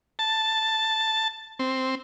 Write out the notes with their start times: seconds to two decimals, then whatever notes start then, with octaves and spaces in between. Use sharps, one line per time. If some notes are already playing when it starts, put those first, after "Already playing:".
0.19 A5
1.59 C4